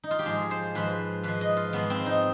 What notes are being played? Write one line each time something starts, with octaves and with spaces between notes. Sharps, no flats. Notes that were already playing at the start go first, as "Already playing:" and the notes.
D#4
F4
G4
G#2 F3 G#4
C5
G#2 F3 B4
G#2 F3 B4
D#5
F4
G#2 F3 B3
C4
D#4